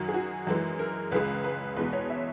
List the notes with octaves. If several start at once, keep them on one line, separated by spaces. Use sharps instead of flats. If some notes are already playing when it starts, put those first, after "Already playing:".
Already playing: F#2 D#3 F#3 F#4
G#4
F#4
F#2 E3 G#3
A#4
C#2 C#3 G#3 B4
B4
E2 B2 G#3 B4
C#5
E5